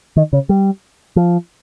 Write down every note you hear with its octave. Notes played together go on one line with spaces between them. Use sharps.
D#3
C#3
G3
F3